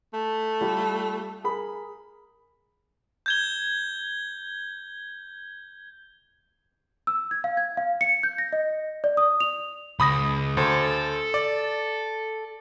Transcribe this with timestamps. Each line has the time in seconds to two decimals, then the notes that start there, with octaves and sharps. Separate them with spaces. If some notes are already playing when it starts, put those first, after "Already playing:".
0.14 A3
0.61 G3 F4
1.44 G#4 A#4 B5
3.26 G6 G#6 G7
7.07 E6
7.31 G#6
7.44 F5
7.57 G#6
7.77 F5
8.01 C#7
8.23 G6
8.38 A#6
8.53 D#5
9.04 D5
9.17 D#6
9.40 F7
10.00 C#2 B5 D#6 A#6
10.57 D2 A4 C5
11.34 D5